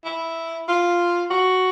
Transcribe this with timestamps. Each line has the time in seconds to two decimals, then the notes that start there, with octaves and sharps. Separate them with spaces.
0.05 E4
0.68 F4
1.30 F#4